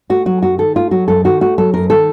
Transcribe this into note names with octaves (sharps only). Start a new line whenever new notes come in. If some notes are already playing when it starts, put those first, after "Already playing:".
A3 F#4
F#3 F#4
F#2 F#4
D#3 A4
A3 F4
F#3 F#4
F#2 A4
D#3 F#4
A3 F#4
F#3 A4
F#2 A#4
D#3 A4